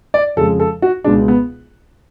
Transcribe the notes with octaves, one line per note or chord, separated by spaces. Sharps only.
D5
F2 C#3 F3 G#3 A4
A4
F#4
C#2 B2 G#3 D4
B3